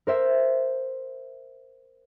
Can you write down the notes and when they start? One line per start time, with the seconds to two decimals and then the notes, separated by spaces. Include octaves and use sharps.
0.07 A#4 C5 E5